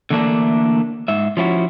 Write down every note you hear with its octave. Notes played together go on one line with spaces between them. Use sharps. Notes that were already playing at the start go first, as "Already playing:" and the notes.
D3 E3 A3 A#3 D4
G#2 E5
F3 C#4 E4 F#4